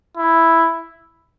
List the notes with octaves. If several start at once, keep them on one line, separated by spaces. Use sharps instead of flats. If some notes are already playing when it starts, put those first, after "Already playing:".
E4